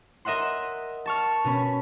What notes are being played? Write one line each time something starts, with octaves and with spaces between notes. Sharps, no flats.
A#4 D#5 E5 F#5 C6
A5 C#6 F6
B2 C#4 B5